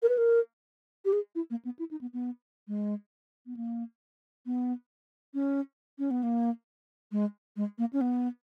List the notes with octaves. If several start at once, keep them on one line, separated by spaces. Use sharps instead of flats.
A#4
B4
A#4
G4
G#4
E4
A#3
B3
E4
D#4
B3
B3
G#3
B3
A#3
B3
C#4
C#4
B3
A#3
G#3
G#3
A#3
C#4
B3